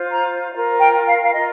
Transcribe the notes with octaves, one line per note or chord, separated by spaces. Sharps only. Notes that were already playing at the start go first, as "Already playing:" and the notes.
Already playing: F4 C5
A#5
F4 A#4 F5
G5
F5
F5
F4 A#4 D#5